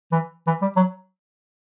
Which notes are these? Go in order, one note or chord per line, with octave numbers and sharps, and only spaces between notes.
E3
E3
G3
F#3